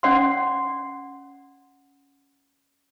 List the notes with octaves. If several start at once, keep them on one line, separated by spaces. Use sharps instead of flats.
C#4 D5 F#5 C6